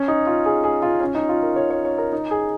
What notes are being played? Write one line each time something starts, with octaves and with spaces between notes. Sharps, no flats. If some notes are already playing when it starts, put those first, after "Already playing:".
Already playing: C#4
D#4
F4
G#4
G#4
F4
C#4
D#4
F4
A#4
C#5
C#5
C#5
A#4
D#4
G#4